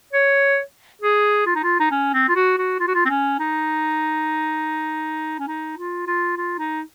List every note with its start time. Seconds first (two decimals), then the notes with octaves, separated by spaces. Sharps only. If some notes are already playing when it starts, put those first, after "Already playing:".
0.13 C#5
1.02 G#4
1.46 F4
1.55 D#4
1.63 F4
1.80 D#4
1.91 C#4
2.13 C4
2.29 F4
2.36 F#4
2.58 F#4
2.80 F4
2.87 F#4
2.95 F4
3.06 C4
3.09 C#4
3.39 D#4
5.39 C#4
5.48 D#4
5.78 F4
6.07 F4
6.37 F4
6.58 D#4